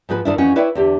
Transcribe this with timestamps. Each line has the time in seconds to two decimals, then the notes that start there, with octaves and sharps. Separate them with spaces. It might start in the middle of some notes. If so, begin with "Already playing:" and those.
0.09 G#2 F3 F#4 B4
0.25 G#2 D#3 D4 E4
0.38 F2 E3 C#4 D#4 F#4
0.56 E4 B4 C#5 D5 E5 G5
0.75 E2 D3 G4